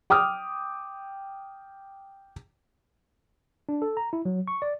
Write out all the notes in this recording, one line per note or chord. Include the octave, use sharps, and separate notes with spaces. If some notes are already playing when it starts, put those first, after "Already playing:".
G5 D6 D#6 F6
D4
A4
A#5
E4
F#3
C#6
D5